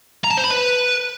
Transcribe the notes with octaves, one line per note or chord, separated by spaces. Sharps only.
A#5
A5
C5
B5
B4